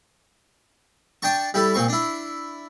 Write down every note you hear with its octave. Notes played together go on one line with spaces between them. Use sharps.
D4 G5 A5 C#6
G3 E4 A4
A#2 C4 C#6
D4 E4